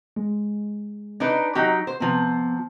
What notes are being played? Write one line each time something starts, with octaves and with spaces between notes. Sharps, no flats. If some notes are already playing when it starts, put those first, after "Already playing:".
G#3
D4 D#4 B4 A#5
F#3 D#4 G4
C5
C3 F3 B3